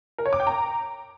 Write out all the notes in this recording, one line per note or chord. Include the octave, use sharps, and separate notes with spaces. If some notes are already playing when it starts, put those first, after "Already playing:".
A#4
C#5
D6
G5
A#5